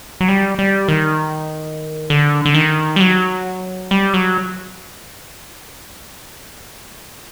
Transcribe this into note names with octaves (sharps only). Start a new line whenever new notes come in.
F#3
G3
G3
D#3
D3
D3
D#3
G3
F#3
G3
F#3